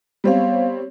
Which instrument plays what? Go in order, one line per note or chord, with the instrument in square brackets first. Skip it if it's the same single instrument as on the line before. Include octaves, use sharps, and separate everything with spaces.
[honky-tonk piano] G3 C4 C#5 [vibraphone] B3 F5